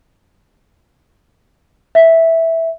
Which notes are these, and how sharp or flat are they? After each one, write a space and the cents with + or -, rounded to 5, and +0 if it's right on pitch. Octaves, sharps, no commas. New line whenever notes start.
E5 -5